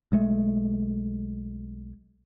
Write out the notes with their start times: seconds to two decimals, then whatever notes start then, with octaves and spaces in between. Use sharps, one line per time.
0.12 B1 G#3 A3